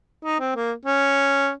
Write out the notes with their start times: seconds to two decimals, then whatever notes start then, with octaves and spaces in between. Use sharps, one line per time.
0.25 D#4
0.40 C4
0.56 A#3
0.85 C#4